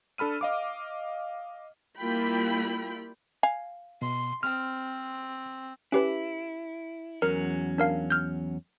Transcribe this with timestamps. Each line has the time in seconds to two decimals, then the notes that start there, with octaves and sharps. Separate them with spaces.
0.18 D4 A4 B5 F6 D#7
0.41 D#5 F5 D6
1.98 G3 A#3 E4 F4 G5 B5
3.43 F5 G#5
4.02 B2 C6
4.43 C4 F6
5.92 C#4 E4 G4 B4
7.22 E2 F#3 C#4 A#4
7.78 D4 A#4 F5
8.10 F6 G6